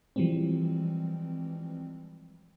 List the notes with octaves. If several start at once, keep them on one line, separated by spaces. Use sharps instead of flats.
E3 F3 G3 G#3 C4